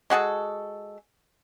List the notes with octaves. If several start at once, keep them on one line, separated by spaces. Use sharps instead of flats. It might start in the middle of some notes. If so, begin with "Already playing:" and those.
G#3 F#4 G#4 A4